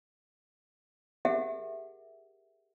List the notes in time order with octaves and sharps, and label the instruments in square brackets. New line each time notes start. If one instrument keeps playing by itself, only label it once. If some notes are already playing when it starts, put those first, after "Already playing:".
[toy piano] G4 G#4 A#4 E5 F#5